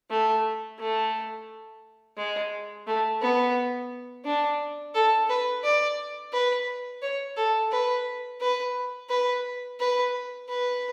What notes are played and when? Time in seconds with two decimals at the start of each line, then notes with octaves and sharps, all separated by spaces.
0.10 A3
0.79 A3
2.17 G#3
2.87 A3
3.21 B3
4.25 D4
4.94 A4
5.29 B4
5.64 D5
6.33 B4
7.02 C#5
7.37 A4
7.72 B4
8.41 B4
9.09 B4
9.80 B4
10.49 B4